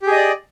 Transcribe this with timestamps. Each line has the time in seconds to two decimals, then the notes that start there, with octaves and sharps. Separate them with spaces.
0.02 G4
0.07 G#4
0.12 D#5
0.16 D5